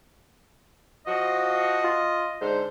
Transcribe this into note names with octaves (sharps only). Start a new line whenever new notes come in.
F3 F#4 D#5
F4
G#2 D3 C5